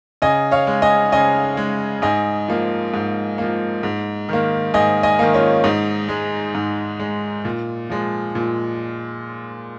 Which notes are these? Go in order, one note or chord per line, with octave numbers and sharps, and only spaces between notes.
C#3 D#5 G#5
C#5 F5
G#3
D#5 G#5
C#3 D#5 G#5
G#3
G#2 D#5 G#5
F3 A#3
G#2
F3 A#3
G#2
D#3 A#3
G#2 D#5 G#5
D#5 G#5
D#3 A#3
C#4 F4
G#2 D#4
G#3
G#2
G#3
A#2
F3 G#3
A#2